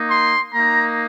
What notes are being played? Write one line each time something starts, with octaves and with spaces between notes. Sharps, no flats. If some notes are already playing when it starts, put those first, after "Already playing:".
Already playing: A#3 D#4
C6
A#3 A#5
D#4